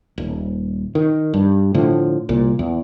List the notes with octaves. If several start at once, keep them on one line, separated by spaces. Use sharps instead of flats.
D#1
D#3
G2
A2 D3 F3
C2 A#2
E2